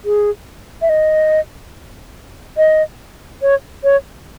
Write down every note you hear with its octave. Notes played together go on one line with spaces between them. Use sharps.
G#4
E5
D#5
D#5
C#5
C#5